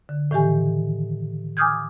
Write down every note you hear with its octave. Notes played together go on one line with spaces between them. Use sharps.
D3
A2 D#3 E3 G4 G#5
G#5 D6 D#6 F6 G6 G#6